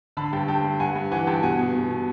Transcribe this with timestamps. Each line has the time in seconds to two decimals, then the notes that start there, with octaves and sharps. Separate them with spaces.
0.17 D3 A5 B5
0.33 G2 G5 A5
0.48 G2 G5 A5
0.64 G2
0.80 G2 F#5 G#5
0.95 G2
1.11 E3 F#5 G#5
1.27 G2 G5 A5
1.43 B2 F#5 G#5
1.59 B2
1.75 B2
1.90 B2